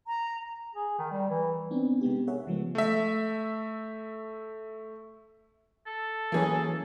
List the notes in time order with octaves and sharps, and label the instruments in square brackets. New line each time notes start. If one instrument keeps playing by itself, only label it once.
[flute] A#5
[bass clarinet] G#4
D#3
G3
E3
[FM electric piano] B3 C4 D4 D#4
C3 G#3 B3 G4
G#4 A#4 C#5 E5 F#5
C#3 F3 G#3 B3
[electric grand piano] A3 E5
[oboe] A4
[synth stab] E3 F#3 C#4 [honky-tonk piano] A#3 G#4